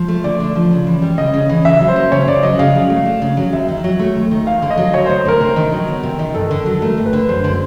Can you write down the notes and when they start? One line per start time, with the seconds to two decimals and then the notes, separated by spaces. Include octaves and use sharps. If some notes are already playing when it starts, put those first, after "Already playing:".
Already playing: F3
0.08 A3
0.24 D3 D5
0.40 D3
0.55 F3
0.71 C#3
0.87 E3
1.02 G3
1.18 C#3 D#5
1.34 C#3
1.49 E3
1.65 C#3 E5
1.80 F#3
1.88 C5
1.96 A#3
2.12 C#3 C#5
2.28 C#3 D5
2.43 F#3 D#5
2.59 C#3 F5
2.75 F#3
2.90 A3
3.06 D4
3.22 C#3
3.37 F#3
3.53 D#2 E5
3.68 D#3
3.84 F#3
3.99 A3
4.15 D#2
4.31 D#3
4.47 D2 F5
4.62 D3
4.70 D#5
4.78 F#3
4.93 D2 C#5
5.06 D2 C5
5.25 D3 A#4
5.41 C3
5.56 D#3
5.72 F#3
5.88 B3
6.03 C3
6.19 D#3
6.34 G2 A4
6.51 D3
6.66 F#3
6.82 A3 A#4
6.97 G2
7.06 B4
7.13 D3
7.29 F#2 C5
7.44 D3